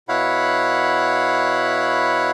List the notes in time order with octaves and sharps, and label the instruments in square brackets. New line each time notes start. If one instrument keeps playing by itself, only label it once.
[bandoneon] B2 E4 C#5 F5 F#5 B5